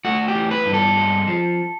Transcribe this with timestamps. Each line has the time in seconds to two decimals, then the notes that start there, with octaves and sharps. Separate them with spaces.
0.05 A3 F#4
0.28 G4
0.35 E3
0.51 B4
0.66 G2
0.74 A4
0.97 G#3
1.27 F3